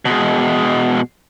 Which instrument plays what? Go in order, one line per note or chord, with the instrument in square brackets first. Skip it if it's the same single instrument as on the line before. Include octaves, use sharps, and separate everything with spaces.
[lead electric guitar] B2 G#3